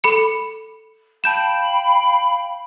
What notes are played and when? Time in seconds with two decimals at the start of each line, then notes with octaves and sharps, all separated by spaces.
0.04 A4 B5 C#7
1.24 F5 G5 A5 B5 G6 E7